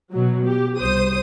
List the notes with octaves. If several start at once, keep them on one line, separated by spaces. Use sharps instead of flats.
B2 F#3
G4
C2 C5 D#6